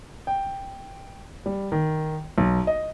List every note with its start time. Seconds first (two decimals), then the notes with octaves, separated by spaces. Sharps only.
0.27 G5
1.46 G3
1.72 D#3
2.38 B1
2.67 D#5